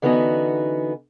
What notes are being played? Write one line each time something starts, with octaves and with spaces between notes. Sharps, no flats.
D3 E3 B3 C#4 D#4 F#4